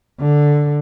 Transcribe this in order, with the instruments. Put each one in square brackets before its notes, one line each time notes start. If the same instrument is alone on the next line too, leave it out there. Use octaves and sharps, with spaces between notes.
[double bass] D3